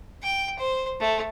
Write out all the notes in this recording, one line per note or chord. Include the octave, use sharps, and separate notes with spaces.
G5
C5
A3